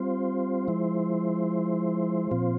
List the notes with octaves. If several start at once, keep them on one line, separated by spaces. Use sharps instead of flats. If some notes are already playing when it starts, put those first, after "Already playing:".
Already playing: G3 C4 F4 C5
F3 G#3 E4
A#2 F3 C4 F4